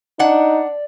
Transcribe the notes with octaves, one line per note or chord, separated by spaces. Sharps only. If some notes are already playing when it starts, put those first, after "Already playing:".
D4 D#4 D5 F#5